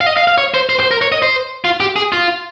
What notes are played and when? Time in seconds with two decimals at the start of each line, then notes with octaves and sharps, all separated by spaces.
0.01 F5
0.06 D#5
0.17 F5
0.28 F5
0.38 C#5
0.54 C5
0.69 C5
0.80 C5
0.91 A#4
1.01 C#5
1.12 D#5
1.22 C5
1.64 F4
1.80 G4
1.96 G#4
2.12 F4